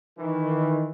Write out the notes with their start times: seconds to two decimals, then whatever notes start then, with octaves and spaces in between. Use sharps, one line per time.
0.18 D#3 E3